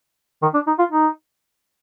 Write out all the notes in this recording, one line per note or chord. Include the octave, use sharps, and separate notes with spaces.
D#3
D4
D#4
F4
D#4